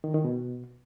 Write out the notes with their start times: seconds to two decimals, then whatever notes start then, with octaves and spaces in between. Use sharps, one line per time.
0.04 D#3
0.14 D#3
0.24 B2